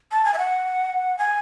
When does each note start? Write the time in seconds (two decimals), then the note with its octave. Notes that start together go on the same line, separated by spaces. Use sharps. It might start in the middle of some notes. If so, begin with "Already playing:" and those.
0.11 A5
0.25 G#5
0.34 E5
0.38 F#5
1.18 G#5